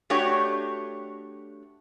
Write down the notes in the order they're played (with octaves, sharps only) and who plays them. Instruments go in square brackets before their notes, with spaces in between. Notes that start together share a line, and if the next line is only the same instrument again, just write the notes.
[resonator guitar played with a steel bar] A3 D4 F#4 G4 C#5